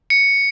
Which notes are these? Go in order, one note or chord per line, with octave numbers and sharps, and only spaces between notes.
C#7